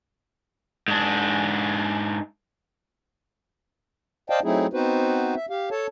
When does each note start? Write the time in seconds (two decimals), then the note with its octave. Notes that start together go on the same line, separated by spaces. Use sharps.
0.88 G#2 D4
4.30 C5 D5 D#5 F5 G5 A5
4.44 F#3 A3 C4 D#4 E4 G#4
4.73 B3 C4 D#4 F#4 B4 C5
5.35 E5
5.50 G4 F5
5.71 A4 C#5 A5